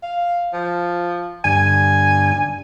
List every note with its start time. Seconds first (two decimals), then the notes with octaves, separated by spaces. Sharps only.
0.03 F5
0.53 F3
1.45 G2 D3 G#5